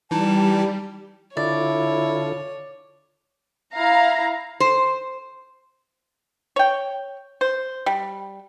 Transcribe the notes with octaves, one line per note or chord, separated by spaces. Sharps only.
E3 G3 D#4 E4 A5
D3 E4 F4 A4 C#5 D5
E4 F5 A#5
C5
C#5 G5
C5
G3